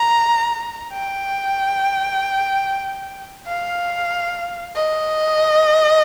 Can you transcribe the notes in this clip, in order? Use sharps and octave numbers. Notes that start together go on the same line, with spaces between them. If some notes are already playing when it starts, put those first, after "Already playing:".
Already playing: A#5
G5
F5
D#5